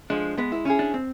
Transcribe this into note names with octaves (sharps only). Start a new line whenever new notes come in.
F3 G#3 D4
G#3 B3
E4
C#4 E4 G#4
D4
C4